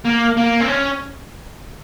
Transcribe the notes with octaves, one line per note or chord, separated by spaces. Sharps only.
A#3
A#3
C4
C#4